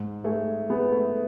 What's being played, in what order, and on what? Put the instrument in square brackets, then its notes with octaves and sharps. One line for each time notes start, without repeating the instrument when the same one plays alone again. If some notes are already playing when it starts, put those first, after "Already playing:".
Already playing: [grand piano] G#2
[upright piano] A3 [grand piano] G#4
[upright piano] B3 [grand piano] G#4
[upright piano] A3